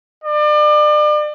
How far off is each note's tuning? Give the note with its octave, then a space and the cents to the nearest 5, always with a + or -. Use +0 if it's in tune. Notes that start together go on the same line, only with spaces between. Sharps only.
D5 +35